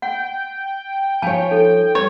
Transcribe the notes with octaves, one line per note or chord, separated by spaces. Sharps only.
F#5 G5
F3 C#5 F5 G#5 A5
D#4 A4
G3 C#5